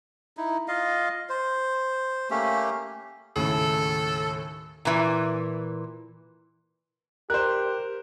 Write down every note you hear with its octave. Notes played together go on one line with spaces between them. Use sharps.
D#4 E4
F4 D#5 F5
C5
A3 A#3 C#4 G4
D#2 A2 C#3 A4
A#2 E3
G4 A#4 C5 F#6